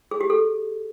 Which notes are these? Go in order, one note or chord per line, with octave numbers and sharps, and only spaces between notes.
G#4
G4
A4